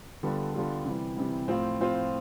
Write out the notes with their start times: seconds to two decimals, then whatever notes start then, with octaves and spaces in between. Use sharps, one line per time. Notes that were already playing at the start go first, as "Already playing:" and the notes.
0.23 D3 G3 B3 F4 A4
0.54 D3 G3 B3 F4 A4
0.85 C3 E3 G3
1.17 C3 E3 G3
1.48 A2 F3 C4 F4
1.80 A2 F3 C4 F4